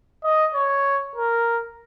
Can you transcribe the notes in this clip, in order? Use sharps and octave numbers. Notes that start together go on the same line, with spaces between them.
D#5
C#5
A#4